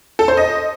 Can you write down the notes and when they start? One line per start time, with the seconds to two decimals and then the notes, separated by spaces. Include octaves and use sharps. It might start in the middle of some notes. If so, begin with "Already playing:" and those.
0.19 A4
0.28 C5
0.37 D#5